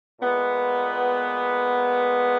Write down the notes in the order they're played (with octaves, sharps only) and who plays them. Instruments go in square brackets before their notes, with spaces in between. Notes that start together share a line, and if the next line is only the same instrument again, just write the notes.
[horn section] A#2 G#3 B3